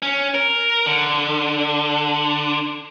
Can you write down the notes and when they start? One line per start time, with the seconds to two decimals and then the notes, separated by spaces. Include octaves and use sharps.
0.02 C#4
0.34 A#4
0.86 D3